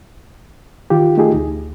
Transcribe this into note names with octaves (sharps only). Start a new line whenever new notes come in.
D#3 F4 G4
A3 D#4 F4 G4 G#4
D2